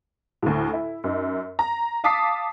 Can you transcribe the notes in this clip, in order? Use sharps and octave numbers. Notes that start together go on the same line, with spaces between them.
D2 A2
E4
F#2 D#4
A#5
F5 A5 D6 D#6 B6 C7